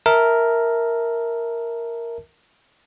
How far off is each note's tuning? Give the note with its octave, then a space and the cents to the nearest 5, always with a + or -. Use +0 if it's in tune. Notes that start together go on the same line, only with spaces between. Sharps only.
A#4 +0 E5 -15 A5 +0